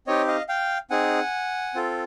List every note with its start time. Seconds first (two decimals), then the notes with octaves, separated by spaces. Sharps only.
0.07 C4 D#4 G4 C#5 D#5
0.28 D#5 F5
0.49 F5 G5
0.90 C4 D#4 G#4 F#5 G#5
1.74 C4 F4 A4